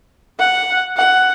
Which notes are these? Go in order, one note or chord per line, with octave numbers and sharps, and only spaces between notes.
F#5
F#5